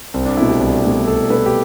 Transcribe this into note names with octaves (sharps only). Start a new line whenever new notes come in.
C2 C4
D4
A3 E4
B2
G4
C2
B2 A3
C2 A4
B2 A3 B4
G4